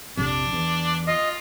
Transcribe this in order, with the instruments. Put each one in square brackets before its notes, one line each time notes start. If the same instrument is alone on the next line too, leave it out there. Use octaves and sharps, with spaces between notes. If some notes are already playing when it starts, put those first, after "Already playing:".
[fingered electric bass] A#1 F2 C3 [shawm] D4
[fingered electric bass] E2
[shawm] F4 [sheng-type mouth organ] D#5